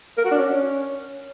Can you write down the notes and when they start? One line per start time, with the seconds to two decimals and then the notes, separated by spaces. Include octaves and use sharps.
0.18 A#4
0.25 F#4
0.31 D4
0.38 C#4